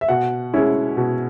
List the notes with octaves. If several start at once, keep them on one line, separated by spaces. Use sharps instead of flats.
E5
B2 F#5
G#3 C#4 E4
B2